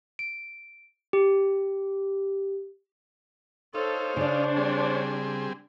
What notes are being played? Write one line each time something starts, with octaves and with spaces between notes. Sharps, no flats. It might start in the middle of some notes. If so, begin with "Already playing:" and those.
D7
G4
D#4 A4 C5 C#5 F5
C#3 D4 D5
G3 C4 G#4